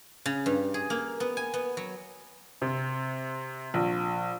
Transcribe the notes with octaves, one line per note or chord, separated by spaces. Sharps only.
C#3
G2
G#4
A#3
B3
G#5
B3
F#3
C3
A#1